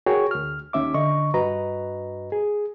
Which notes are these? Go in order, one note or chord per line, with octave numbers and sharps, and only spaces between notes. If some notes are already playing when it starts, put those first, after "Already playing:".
F#4 G#4 A#4 C#5 G5 C#6
D2 F6
D#2 D#3 C#4 E5 D6
D3 D#5 C#6
G2 F#4 B4 D#5 A#5
G#4